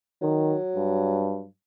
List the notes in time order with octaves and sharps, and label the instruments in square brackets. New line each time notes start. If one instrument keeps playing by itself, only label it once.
[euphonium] D#3 [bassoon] F#3
[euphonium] G2